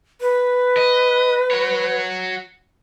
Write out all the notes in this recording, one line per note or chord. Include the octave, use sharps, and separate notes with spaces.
B4
D#5
F#4 C#5